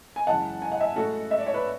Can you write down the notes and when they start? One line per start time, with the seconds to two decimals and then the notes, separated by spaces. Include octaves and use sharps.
0.16 G#5
0.27 F#2 C#3 E3 G#3 F#5 A5
0.62 G#5
0.72 F#5
0.80 E5 G#5
0.96 A2 G#3 F#4 A4
1.31 E5
1.39 D5
1.47 C#5
1.54 B4 D5